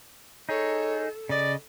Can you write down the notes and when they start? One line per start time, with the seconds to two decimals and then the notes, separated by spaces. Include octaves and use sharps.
0.49 D#4 G#4 A4 C#5
1.29 C#3 D5 D#5